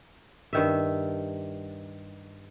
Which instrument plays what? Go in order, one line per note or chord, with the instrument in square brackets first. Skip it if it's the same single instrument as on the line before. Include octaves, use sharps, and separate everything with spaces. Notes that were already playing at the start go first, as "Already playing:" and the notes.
[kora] G2 D#3 E5